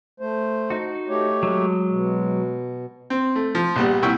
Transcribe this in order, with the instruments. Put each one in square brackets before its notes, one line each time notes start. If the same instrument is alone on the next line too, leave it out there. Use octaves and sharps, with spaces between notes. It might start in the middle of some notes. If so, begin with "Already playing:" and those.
[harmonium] A3 C5
[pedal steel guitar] D#4 F#4
[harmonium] A3 G4 C#5
[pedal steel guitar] F#3 G#3
[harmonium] B2
[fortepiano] C4
A3
F3
A#1 G3 B3
C2 A#2 E4 F#5 G5 C#6